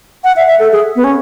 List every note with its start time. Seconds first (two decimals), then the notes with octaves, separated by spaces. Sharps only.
0.24 F#5
0.36 E5
0.47 E5
0.59 A4
0.72 G#4
0.96 B3
1.04 C#4